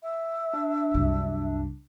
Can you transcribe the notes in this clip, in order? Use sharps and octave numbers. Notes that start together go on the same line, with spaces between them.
E5
D4
C2 F#2